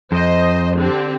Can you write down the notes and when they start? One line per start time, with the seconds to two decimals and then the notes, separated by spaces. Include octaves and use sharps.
0.12 F2 C5 D#5
0.76 D3 C4 G4